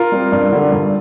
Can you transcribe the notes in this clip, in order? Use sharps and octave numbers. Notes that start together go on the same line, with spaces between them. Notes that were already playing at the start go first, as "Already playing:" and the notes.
Already playing: F4 A#4
G3 C4
G2
D3 G3
G2